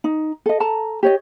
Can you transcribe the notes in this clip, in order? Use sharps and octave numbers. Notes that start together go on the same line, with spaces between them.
D#4
A4 D#5
A4 A5 A#5
G4 C#5 D#5